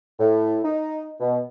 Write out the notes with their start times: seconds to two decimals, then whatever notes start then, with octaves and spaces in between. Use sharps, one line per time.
0.19 A2
0.64 D#4
1.20 B2